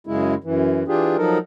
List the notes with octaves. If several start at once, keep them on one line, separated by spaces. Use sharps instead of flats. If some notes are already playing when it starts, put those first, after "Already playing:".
F#2 C#3 G#3 E4
F#2 E3
E3 D4 F4 G4 G#4
F3 F#3 D#4 A4 A#4